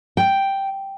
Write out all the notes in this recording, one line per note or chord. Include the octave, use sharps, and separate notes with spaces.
G5